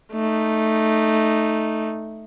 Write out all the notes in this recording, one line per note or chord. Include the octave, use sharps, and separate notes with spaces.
A3 D#4